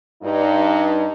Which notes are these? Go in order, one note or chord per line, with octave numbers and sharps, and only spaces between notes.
G2 D#4